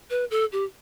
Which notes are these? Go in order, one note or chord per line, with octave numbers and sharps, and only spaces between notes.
B4
A4
G4